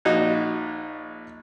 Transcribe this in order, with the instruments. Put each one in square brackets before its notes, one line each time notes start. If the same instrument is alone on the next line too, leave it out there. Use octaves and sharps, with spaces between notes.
[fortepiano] A#1 D#4 F#4